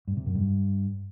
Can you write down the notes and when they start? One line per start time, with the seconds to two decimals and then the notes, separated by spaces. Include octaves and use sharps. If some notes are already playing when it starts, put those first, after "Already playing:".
0.08 G2
0.17 C3
0.26 F#2
0.35 G2